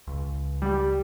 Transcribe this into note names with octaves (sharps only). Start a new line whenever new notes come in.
C#2
G3 G4